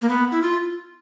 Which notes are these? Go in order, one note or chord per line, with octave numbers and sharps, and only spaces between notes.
A#3
B3
E4
F4